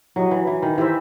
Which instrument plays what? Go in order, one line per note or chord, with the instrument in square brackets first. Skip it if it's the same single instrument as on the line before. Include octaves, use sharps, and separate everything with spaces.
[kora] F#3 [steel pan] E4 G4 D#5
[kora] E3
E3
D#3
[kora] E3 [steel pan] E4 G4 C5 E5